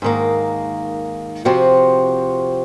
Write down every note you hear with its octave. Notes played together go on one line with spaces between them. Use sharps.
G#2 D#3 A#3
C3 F3 C4 F#4